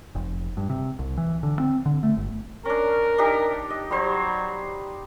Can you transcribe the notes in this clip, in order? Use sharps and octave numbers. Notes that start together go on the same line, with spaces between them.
F1
G2
C3
C2
E3
D3
C4
D3
A3
G1
C#4 D4 A#4
D4 D#4 G4
D#5
F#3 G3 C5